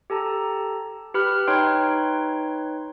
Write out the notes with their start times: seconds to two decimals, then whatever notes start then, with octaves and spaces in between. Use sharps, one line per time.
0.10 G4 A4 A5 A#5
1.14 G4 B4 B5 F6
1.47 D#4 B4 C#5 G5 C6 G#6